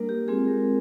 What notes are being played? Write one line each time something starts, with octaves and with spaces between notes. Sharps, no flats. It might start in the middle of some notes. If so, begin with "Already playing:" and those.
Already playing: G3 A#3 D4 A#4
G4
G#3 C4 F4 G#4
A#4